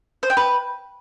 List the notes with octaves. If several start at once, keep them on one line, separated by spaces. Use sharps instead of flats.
C5
G5
B4